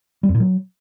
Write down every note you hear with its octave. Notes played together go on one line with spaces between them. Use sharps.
G3
F2
A#2
F#3